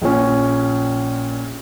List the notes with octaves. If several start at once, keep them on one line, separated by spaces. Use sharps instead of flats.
A#1 A#2 C#4